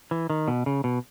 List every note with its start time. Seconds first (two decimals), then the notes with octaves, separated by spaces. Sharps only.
0.11 E3
0.30 D#3
0.48 B2
0.66 C#3
0.84 B2